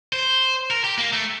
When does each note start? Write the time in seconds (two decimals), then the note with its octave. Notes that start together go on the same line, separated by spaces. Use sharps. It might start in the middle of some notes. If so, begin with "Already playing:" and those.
0.13 C5
0.71 A#4
0.84 G4
0.98 A#3
1.13 A3